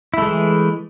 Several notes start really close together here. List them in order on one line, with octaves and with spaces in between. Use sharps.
E4 A3 G#3 E3